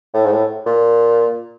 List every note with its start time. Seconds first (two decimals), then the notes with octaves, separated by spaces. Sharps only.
0.14 A2
0.25 G#2
0.31 A2
0.66 A#2